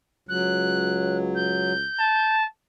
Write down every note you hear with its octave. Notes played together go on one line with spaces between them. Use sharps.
C#2 F#3 F#6
G6
A5